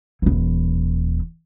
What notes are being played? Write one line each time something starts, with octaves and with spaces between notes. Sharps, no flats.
D#1 E3